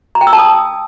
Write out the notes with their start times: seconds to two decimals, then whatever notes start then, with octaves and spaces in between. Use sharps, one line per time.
0.15 A#5
0.21 G5
0.27 E6
0.33 A5
0.39 D#6